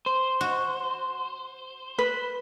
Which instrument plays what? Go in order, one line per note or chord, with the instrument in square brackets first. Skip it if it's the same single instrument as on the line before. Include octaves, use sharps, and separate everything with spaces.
[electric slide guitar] C5
[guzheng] F#4
[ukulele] B4